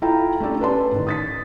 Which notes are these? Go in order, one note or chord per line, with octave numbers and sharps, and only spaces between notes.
E4 F4 A4 G5 A#5
A3 C#4 D4 G4 A4
C#4 B4 D5 A5 C6
A2 D#3
D#6 A6 B6